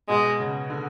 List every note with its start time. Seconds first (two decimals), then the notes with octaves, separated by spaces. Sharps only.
0.09 B2 G#3
0.40 C#3
0.70 D3